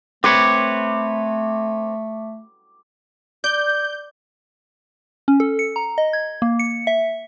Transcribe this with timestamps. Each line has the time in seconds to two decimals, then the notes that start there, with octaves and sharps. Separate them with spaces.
0.24 A3 C4 B4 C#5 D6
3.44 D5 G6
5.28 C#4
5.40 A4
5.59 C#7
5.76 A#5
5.98 D#5
6.13 G#6
6.42 A#3
6.59 C#7
6.87 E5